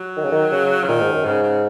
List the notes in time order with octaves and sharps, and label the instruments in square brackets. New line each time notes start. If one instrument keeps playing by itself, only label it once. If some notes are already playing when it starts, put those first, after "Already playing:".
Already playing: [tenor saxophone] F#3
[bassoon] D#3
C#3
D#3
C#3
[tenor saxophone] C#3
[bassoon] A#2 [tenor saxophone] D#3
[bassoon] G#2
F#2
[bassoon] G#2 [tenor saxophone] C#3
[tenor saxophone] C#3